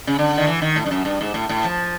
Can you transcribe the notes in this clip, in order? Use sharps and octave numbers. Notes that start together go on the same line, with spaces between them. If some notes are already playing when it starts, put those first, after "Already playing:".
C#3
D3
D#3
E3
D#3
A2
G2
F#2
G2
G#2
A2
A2
F3